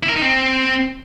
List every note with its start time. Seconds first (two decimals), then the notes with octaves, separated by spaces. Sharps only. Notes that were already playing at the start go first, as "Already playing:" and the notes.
0.03 E4
0.09 A#4
0.15 D#4
0.22 C4